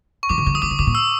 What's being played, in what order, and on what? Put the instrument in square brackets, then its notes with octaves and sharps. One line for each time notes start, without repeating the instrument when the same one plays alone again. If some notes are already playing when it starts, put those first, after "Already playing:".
[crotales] C#6
[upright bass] E3 [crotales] D6
[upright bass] D3
C#3
[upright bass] D#3 [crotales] D#6
[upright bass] D3 [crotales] D6
[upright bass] C#3
[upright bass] C3 [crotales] D6
[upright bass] A#2
[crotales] E6